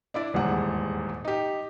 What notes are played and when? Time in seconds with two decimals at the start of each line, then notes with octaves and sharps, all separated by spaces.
0.14 D4 E4 D5
0.34 D#1 E2 G#2 F#5
1.25 D#4 G4